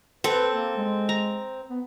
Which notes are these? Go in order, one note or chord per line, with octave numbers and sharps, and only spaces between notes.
C4 A4 B4
A#3
G#3
A#5
B3